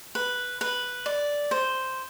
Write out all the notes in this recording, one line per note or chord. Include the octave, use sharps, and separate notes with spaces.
B4
B4
D5
C5